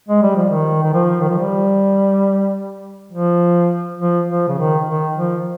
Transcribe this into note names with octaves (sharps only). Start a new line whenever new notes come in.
G#3
G3
F3
D#3
D#3
F3
D#3
F3
G3
F3
F3
F3
C#3
D#3
D#3
F3